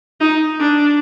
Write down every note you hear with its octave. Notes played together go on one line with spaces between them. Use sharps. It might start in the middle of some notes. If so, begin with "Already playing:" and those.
D#4
D4